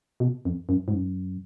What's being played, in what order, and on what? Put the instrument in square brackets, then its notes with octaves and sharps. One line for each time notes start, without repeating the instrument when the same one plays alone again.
[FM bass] B2
F2
F#2
G#2
F#2